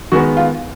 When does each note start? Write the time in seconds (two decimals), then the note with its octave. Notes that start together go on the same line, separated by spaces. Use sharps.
0.12 D#3 G#3 B3 F#4
0.37 F4